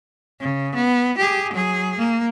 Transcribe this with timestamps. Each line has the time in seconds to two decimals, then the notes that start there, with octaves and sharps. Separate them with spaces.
0.40 C#3
0.75 B3
1.18 G4 G#4
1.53 F#3 G#4
1.97 A#3